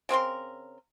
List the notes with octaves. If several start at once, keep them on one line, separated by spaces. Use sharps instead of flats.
C#3 C4 A#4 C6